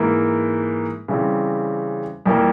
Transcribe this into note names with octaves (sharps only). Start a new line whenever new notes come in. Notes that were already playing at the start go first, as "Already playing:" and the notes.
Already playing: G#2 E3 A#3
C#3 E3 G3 C4
F2 E3 G3 A#3